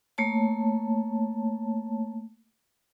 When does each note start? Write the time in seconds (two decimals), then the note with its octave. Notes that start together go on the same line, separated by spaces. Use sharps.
0.18 A3 A#3 C#5 A5